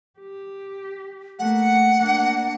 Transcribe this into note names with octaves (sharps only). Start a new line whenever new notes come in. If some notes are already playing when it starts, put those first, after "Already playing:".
G4
A3 A#3 F#5
A#3 D4